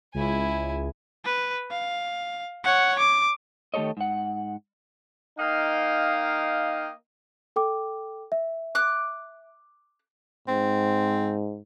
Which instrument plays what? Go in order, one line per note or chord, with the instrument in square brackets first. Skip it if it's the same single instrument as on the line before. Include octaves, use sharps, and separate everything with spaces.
[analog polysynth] C#2 [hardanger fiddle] E4 G#5
[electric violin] B4
F5
C#5 F#5
D6
[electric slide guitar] D#3 A3 G4 A4 C#5 D#5
G#2 F#5
[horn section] A#3 D#4 D#5 F5 G5
[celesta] A4 G5 D6
E5
[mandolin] D6 F#6
[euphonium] G#2 [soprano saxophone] C4